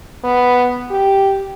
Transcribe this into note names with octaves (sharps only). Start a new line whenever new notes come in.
B3
G4